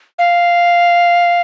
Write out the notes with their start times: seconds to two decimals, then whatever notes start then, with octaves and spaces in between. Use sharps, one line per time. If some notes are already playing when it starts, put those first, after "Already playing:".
0.19 F5